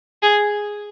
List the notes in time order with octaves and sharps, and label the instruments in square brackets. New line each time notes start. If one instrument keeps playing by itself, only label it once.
[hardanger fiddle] G#4